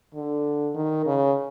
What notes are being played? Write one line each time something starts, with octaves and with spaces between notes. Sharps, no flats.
D3
D#3
C#3